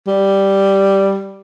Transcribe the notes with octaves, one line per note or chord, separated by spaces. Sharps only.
G3